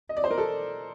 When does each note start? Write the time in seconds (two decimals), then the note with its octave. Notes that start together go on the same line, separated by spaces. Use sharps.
0.09 D#5
0.17 D5
0.24 C5
0.31 A#4
0.38 A4